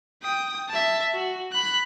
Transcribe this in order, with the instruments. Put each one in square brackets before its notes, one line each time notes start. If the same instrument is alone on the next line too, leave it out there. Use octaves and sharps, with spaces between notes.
[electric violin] G5 D#6
E5 A5
F#4
B5 F#6